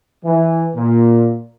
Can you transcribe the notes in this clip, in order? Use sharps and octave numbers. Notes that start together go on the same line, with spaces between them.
E3
A#2